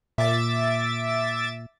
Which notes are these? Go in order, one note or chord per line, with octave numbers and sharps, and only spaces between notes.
A#2 E5 D6 A6